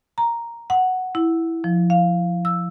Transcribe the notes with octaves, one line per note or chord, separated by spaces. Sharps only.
A#5
F#5
E4
F3
F5
E6